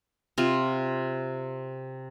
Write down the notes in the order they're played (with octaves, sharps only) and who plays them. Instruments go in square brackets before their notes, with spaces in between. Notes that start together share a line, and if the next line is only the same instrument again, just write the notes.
[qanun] C3 F4